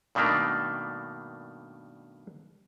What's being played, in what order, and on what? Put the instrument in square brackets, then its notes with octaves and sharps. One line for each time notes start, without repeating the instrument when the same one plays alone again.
[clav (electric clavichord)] G2 B2 D#3 A3 A#3 D4